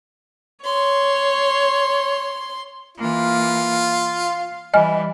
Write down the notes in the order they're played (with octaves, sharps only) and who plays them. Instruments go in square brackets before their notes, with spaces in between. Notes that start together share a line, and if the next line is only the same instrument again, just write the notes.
[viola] C#5 [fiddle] C6
[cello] E3 A#3 [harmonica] F4
[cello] F5
[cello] E3 G3 [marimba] D#5 G#5 F6